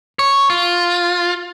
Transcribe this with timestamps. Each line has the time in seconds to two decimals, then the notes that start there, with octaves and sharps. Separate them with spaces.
0.19 C#5
0.50 F4